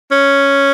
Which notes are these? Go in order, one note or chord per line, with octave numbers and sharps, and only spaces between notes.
C#4